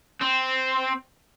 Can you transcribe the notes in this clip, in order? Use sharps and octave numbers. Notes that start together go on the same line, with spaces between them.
C4